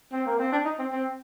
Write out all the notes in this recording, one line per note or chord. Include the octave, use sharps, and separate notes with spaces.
C4
A#3
C4
D4
D#4
C4
C4